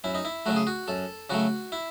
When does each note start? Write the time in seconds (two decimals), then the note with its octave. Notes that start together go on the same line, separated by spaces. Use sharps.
0.04 F#2 E4
0.15 D#4
0.25 E4
0.46 C#3 F#3 A3 F#4
0.56 G#4
0.67 F#4
0.88 F#2 A4
1.30 C#3 F#3 A3 F#4
1.72 E4